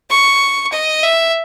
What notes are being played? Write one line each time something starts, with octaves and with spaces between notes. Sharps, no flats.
C#6
D#5
E5